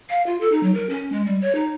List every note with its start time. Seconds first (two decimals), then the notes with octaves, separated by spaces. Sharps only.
0.09 F5
0.26 F4
0.41 A4
0.52 D#4
0.63 F#3
0.74 A#4
0.90 C#4
1.12 G#3
1.26 G3
1.41 C#5
1.55 D#4